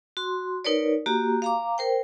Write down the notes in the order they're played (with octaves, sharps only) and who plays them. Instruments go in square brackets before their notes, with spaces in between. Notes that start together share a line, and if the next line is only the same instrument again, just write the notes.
[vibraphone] F#4 C6
D#4 A#4 B4 C#5 D5
A#3 F#4 G4 A#5
F5 A#5 D6
A#4 C5 G5